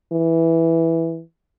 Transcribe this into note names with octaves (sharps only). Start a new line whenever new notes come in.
E3